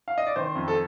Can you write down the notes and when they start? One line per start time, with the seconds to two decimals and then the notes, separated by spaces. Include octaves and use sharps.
0.08 F5
0.18 D#5
0.27 D5
0.36 D#3 C5
0.55 F2
0.68 A4